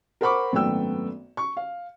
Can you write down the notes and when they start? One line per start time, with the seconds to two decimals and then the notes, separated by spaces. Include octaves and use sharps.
0.21 A#4 C5 F#5 B5 C#6 D6
0.52 G#1 F#2 A3 B3 G5 E6
1.37 C#6
1.57 F5